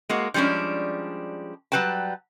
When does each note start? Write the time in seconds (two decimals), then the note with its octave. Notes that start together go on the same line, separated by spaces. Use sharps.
0.09 G#3 A#3 F#4
0.34 F3 G3 G#3 C#4 D4
1.72 F#3 G3 B4 G5 A5